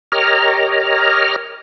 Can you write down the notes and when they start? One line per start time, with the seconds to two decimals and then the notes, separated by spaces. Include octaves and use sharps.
0.12 G4 A#4 C#5 D#5 A#5 F6